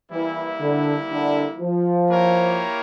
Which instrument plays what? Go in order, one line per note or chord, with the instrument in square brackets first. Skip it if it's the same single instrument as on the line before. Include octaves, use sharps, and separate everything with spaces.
[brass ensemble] E3 [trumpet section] G3 A#3 E4
[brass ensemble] D3
D3
F3
[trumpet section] A#3 E4 G4 A#4 C#5